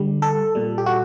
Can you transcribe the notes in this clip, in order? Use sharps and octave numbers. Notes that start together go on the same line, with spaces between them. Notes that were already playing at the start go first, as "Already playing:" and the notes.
Already playing: D3 G3
A4
A#2 G3
G4
F#4